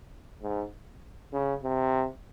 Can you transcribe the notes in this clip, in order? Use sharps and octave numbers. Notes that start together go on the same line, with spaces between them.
G#2
C#3
C3